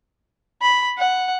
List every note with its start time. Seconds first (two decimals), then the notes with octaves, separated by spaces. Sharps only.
0.61 B5
0.98 F#5